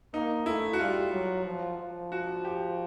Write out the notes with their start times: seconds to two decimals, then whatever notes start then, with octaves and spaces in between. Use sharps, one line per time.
0.13 A#3 D#4
0.46 A3 E4
0.73 F#4
0.79 G3 F4
1.13 F#3
1.45 F3
1.79 F3
2.12 F#4
2.45 G4